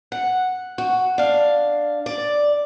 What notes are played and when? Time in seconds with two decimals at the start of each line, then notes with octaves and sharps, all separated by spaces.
0.12 F#5
0.78 F#4
1.18 D4 F5
2.06 D5